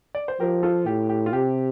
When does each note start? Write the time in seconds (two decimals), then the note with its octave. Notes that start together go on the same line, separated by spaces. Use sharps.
0.15 D5
0.28 C5
0.40 F3 G4 A#4
0.63 F4 A4
0.86 A2 G4
1.09 G4
1.26 F4
1.33 C3 G4